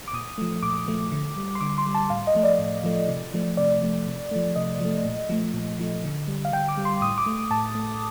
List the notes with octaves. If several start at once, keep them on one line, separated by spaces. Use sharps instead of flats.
D6
A#2 D#6
F3 A3
A#2 D6
F3 A3
D3
G3
C6
D3 D6
C6
G3
A5
A2 F5
D#5
F3 A3
D5
A2
F3 A3
C3
F3 A3
C3 D5
F3 A3
C3
F3 A3
C3 D#5
F3 A3
A#2
F3 A3
A#2
F3 A3
D3
G3
F5
D3 G5
D6
G3
C6
A2 D#6
D6
A3
A2 A5
A3